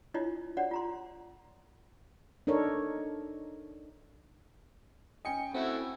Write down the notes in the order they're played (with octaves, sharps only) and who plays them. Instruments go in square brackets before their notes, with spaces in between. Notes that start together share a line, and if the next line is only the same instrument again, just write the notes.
[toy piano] D4 E4 F4 C#5 D#5
D4 F#4 C#5 D5 F#5
F4 A#5 C6
[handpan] D4 D#4 A4 A#4 C#5
[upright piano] C#4 G5 G#5 [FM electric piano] D#5 C#7
[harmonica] A3 E4 F#4 [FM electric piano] C4